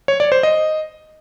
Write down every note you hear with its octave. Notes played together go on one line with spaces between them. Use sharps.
C#5
D5
C5
D#5